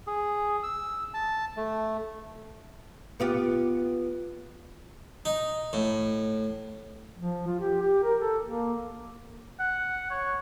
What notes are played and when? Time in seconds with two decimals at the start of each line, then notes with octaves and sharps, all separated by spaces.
0.07 G#4
0.63 E6
1.14 A5
1.57 A3
3.20 B3 F4 G4
5.25 D#4
5.73 A2
7.18 F3
7.47 F4
7.59 G4
7.81 G4
8.03 A#4
8.20 A4
8.46 A#3
9.60 F#5
10.10 C#5